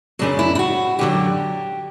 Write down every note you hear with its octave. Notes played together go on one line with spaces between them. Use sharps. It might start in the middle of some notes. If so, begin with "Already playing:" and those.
F#2 C#3 F#3 D4
E4
E4
F#4
F#2 D3 F#3 G4